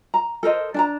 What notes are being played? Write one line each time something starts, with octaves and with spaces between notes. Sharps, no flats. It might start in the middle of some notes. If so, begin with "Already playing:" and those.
A#5
A4 A#4 C5 D#5
D4 A5 A#5